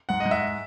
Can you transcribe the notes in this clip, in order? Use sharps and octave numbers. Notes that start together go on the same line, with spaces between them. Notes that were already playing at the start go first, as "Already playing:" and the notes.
G#2 F#5
D#5
G#2
E5